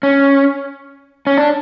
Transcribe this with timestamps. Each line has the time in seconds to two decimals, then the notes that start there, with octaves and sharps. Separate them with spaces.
0.03 C#4
1.27 C#4
1.38 D4